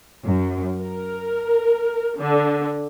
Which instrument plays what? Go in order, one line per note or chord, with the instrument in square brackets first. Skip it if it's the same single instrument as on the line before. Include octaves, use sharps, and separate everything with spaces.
[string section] F#2
A#4
D3